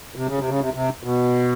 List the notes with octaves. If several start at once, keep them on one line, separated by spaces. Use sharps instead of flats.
C3
C#3
C3
C#3
C3
C3
B2